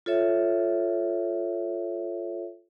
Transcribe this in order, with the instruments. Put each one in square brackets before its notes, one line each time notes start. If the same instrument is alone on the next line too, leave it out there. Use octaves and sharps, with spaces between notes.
[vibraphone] F4 A4 C#5 E5